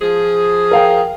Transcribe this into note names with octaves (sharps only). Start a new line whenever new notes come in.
F3 G#4
A#4 F5 G5